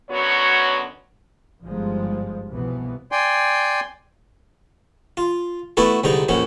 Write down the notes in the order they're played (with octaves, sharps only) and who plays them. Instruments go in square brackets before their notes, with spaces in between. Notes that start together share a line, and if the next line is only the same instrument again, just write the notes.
[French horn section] F#2 D3 B3 F#4 C#5
[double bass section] G1 G#2 F3 G3 G#3
C2 B2 E3 F3 B3
[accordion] D5 G5 G#5 C6
[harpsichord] F4
A3 B3 E4 F#4 A4
C2 G#2 D3 D#4 A#5
A#1 F2 C#4 F#4